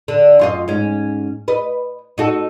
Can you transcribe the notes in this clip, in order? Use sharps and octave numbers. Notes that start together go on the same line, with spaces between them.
D3
F#2 F4 D#5
G#2 C#4
B4 D#5
D#4 F#4 A4